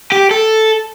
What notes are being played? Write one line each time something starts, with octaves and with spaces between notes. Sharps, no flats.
G4
A4